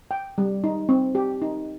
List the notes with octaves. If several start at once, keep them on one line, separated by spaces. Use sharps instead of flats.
G5
G3
D#4
C4
G4
D#4